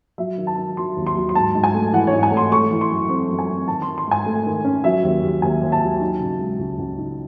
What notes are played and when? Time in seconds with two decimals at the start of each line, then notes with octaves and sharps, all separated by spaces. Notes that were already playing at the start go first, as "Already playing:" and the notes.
0.18 F#3 E5
0.38 D#3
0.47 A5
0.58 D#3
0.77 F#3 C6
0.97 D#2
1.07 C6
1.16 F#3
1.29 C6
1.35 G#2 A5
1.55 G#2
1.64 G#5
1.74 A3
1.93 E3 F#5
2.07 C#5
2.13 G#2
2.23 G#5
2.32 A3
2.37 C6
2.52 A3 C#6
2.71 E3
2.81 C6
2.90 F#2
3.09 C4 C#6
3.29 F#2
3.39 G#5
3.49 C4
3.68 D#3 A5
3.82 C6
3.87 D#3
3.98 C6
4.06 G#2
4.11 G#5
4.26 A3
4.46 D#3
4.64 C#4
4.84 F#3 E5
5.03 D#2
5.23 D#2
5.42 D#2 G#5
5.62 D#2
5.72 A5
5.82 F#3
6.01 D#4
6.20 C#3
6.39 G#3
6.59 C#2
6.78 C#2
6.98 D#4